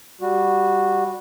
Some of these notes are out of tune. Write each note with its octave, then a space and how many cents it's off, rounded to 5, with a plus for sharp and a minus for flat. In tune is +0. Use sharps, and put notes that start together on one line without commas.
G3 +0 F#4 -10